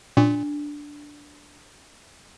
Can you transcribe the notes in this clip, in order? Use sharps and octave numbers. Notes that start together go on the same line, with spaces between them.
A#2 D4